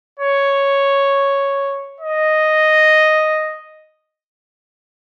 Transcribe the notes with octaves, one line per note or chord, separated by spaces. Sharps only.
C#5
D#5